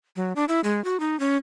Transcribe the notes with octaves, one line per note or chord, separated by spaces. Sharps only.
F#3
D4
E4
G#3
F#4
D#4
C#4